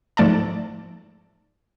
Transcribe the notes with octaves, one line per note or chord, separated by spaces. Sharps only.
G#2 F3 A3 D5 A5